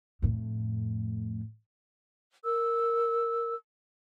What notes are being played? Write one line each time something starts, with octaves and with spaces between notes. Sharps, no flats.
F2 A2
A#4 E6